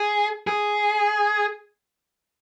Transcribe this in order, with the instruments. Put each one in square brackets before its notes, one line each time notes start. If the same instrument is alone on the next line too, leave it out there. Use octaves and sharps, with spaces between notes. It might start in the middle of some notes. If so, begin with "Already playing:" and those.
Already playing: [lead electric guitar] G#4
G#4